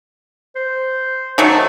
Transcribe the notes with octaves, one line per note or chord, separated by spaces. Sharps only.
C5
D#3 F#3 A3